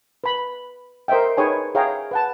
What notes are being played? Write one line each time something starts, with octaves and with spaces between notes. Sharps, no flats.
B4 B5
A#4 C5 D#5 E5 G5
D#4 G#4 B4 C#5 G5 G#5
G#4 C#5 E5 F5 G5 A#5
B4 F#5 A5